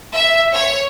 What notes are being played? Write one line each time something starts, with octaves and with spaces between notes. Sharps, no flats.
E5
C#5